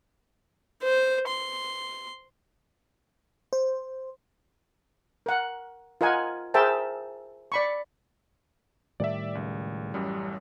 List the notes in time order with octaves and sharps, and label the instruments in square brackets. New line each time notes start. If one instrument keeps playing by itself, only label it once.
[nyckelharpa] C5
C6
[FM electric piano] C5
[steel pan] A#4 F#5
F4 A#4 D#5 F#5 G#5
G#4 A#4 C5 E5 G5 A5
D5 B5 C#6
[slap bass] A2 D#3 G3 [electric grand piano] D5 E5
[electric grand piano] C#2
A1 F#2 G3